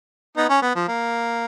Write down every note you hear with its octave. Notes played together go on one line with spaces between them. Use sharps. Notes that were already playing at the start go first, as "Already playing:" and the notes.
B3 D#4
C#4
B3
F3
A#3